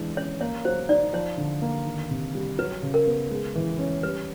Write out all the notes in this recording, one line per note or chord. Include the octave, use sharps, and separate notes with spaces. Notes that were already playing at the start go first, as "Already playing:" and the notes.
Already playing: E3 G#3 D4
C#4 C#5
A#3 C#5
F#3 C5
D#4 D5
F3 C#5
D3
A#3
D#3
C3
G3
F#3 B4
C#3
A#4
B3
G#3
E3
C#4
G3 B4